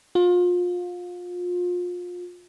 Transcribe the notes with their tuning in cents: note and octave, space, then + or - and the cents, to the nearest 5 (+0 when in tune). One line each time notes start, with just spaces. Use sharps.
F4 +30